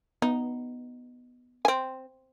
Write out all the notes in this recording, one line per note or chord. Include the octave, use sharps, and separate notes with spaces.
B3 D#4
C4 G#5